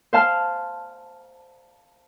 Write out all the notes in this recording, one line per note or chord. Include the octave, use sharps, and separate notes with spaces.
C5 F5 A5 F6